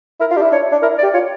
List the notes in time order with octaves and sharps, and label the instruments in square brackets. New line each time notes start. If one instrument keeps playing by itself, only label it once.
[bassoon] E4 [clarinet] A#4
[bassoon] F4
[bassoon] D4 [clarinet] G4
[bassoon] E4
[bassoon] D4 [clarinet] C#5
[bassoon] D4
[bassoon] E4 [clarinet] A#4
[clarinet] D5
[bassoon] G4
[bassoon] F4 [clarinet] C#5